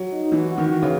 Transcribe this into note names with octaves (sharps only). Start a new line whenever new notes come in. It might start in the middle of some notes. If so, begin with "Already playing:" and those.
Already playing: F#3
D#4
E3 F#4
F#4
D#3
E3
C#3